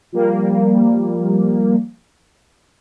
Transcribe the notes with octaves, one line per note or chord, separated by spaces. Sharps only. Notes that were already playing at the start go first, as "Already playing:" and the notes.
F3 G3 A#3